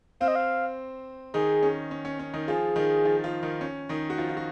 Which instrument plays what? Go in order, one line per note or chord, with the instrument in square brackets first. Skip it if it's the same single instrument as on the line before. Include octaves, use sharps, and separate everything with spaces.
[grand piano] C4 C5 [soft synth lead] F5
[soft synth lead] D#5
F5
[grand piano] D#3 D#4 [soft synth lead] G#4
[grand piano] C#4
C#4
C#4
C#4
D#3 D#4
[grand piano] F3 F4 [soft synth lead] G#4
[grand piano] D#3 D#4
F3 F4
F3 F4
D#3 D#4
C#4
D#3 D#4
F#4
F3 F4
F4
F#4